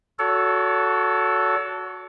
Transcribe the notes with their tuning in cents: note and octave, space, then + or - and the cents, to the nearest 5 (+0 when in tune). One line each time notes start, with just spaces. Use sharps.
F#4 -10 A4 +0 C#5 +35